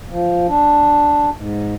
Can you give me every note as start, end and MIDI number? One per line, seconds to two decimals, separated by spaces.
0.10 0.47 53
0.48 1.30 62
1.36 1.74 44